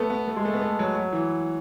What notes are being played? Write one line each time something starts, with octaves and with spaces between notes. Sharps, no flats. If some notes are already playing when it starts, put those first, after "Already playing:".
Already playing: A3 B3
B3
A3
G#3
A3
B3
A3
F#3
F#3
E3